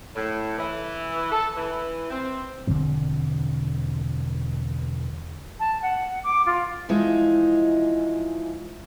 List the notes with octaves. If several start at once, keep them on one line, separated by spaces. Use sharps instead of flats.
A2
E3
A4
E3
C4
E1 D3 F3 C4
A5
F#5
D6
F4
E3 F3 G#3 D#4